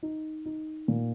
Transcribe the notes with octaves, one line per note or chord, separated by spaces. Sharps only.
D#4
D#4
A#2